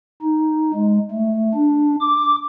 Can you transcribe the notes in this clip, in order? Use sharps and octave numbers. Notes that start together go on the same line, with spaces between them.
D#4
G#3
A3
D4
D6